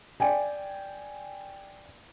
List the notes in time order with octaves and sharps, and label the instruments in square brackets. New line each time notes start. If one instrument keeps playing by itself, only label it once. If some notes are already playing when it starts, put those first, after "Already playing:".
[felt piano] D5 G5 G#5